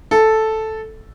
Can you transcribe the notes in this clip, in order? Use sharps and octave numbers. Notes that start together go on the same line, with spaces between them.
A4